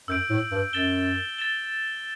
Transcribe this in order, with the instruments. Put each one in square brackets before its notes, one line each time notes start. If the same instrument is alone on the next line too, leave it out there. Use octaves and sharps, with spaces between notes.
[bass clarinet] F#2 [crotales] E6 G6 D7 F#7
[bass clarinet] A2
G2
[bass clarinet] F#2 [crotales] A6 E7 G7
[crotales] A6 E7 G7